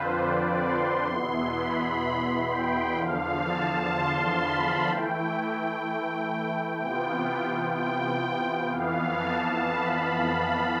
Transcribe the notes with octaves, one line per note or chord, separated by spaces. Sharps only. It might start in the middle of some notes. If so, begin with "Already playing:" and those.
Already playing: F2 D3 F3 C4 F4 B4 C5
D5
C6
E2 B2 B3 E4 C6
B5
G5
E2 D3 F3 F5
A5
C6
B5
E3 A3 E4 G5
G5
G5
C3 E3 B3 F4 G5
G5
F2 E3 B3 F5
A5
B5
B5